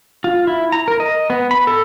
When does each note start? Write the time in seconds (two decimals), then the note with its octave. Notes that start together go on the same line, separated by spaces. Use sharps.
0.24 F4
0.47 E4
0.72 A#5
0.88 A#4
1.00 D#5
1.30 B3
1.51 B5
1.67 A4